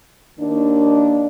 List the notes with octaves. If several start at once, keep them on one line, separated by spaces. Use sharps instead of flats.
D#2 D#3 A#3 D4